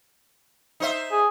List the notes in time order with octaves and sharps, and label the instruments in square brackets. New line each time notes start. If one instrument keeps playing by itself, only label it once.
[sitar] D#4 C5 E5
[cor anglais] G#4